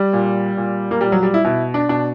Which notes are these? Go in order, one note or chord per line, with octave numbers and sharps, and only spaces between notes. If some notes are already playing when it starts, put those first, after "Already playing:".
Already playing: G3
A#2
A#2
A#3
A#2 G3
F#3
G3
E4
B2 E4
D4
B2 D4